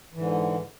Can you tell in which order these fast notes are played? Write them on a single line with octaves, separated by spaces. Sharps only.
E3 G#2 D3